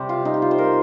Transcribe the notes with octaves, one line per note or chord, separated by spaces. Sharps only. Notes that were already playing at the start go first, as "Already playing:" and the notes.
Already playing: C3 G3 C4 G4
F4
D#4
G4
F4
C5
A#4